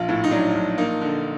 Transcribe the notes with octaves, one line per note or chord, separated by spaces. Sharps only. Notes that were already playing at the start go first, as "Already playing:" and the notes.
Already playing: A#1 F4
A2
D#4
F#3 D4
A#1
A#3 D#4
D3